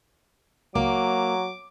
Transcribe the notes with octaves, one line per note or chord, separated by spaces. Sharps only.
C#2 F#3 A#3 D6